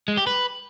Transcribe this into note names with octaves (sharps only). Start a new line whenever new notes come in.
G#3
G4
B4